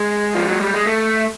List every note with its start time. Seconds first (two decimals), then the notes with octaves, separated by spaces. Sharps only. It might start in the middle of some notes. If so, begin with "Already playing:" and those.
Already playing: G#3
0.35 F3
0.48 F#3
0.61 G3
0.74 G#3
0.87 A3